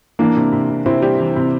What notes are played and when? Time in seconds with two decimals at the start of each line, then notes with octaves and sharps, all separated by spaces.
0.19 E3 A#3 D4
0.36 C3
0.52 C3
0.69 C3
0.86 C3 C4 E4
1.02 G3
1.19 E3
1.36 C3